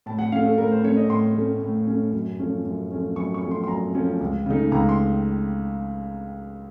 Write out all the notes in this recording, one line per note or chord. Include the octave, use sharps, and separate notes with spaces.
A2 A5
F#5
A3 C#4 F5
A4
A2 A#4
C5
A3 C#4 C#5
D#5
A2 C6
A3 C#4
A2
A3 C#4
F#2
F3 A3 C#4
F#2
F3 A3 C#4
F#2 C#6
C#6
F3 A3 C#4
C6
C6
F#2 A#5
F3 A3 C#4
C#2
C#3 A3 D#4
C#2 A#5
C6